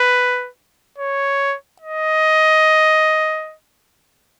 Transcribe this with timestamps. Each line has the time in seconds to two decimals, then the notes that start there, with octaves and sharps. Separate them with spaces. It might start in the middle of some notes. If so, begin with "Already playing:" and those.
Already playing: B4
0.98 C#5
1.81 D#5